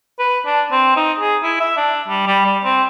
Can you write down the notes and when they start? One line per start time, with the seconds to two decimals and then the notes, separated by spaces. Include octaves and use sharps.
0.19 B4
0.46 D4
0.71 C4
0.96 D#4
1.19 G#4
1.43 E4
1.60 E5
1.77 D4
2.08 G3
2.27 G3
2.46 G3
2.64 C4